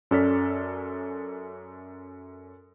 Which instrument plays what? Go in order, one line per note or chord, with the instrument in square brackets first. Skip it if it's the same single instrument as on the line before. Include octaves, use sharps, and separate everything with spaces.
[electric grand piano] F#2 C#4 A4 D5 F6 B6